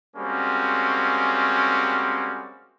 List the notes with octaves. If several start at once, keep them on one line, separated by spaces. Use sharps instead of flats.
G3 G#3 A#3 C4 C#4 F#4